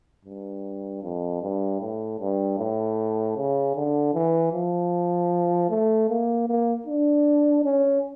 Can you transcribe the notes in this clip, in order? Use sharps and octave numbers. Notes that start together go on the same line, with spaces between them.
G2
F2
G2
A2
G2
A2
C#3
D3
E3
F3
A3
A#3
A#3
D4
C#4